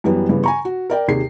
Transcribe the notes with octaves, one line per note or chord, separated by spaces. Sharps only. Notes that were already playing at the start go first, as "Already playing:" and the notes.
F#2 E3 G3 B3
G2 C#3 E3 B3
G#5 A#5 C#6
F#4
A#4 D5 G5
D#2 C3 G#4 C7